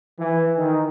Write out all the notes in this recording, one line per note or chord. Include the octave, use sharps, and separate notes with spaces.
E3
D#3